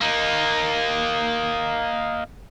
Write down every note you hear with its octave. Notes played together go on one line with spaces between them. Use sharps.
A#3 D#4